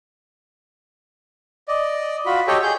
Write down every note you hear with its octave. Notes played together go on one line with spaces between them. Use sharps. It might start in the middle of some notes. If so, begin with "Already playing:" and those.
D5 D#5
F4 F#4 B5
G4 A4 C#5 D#5 G5
G#4 G6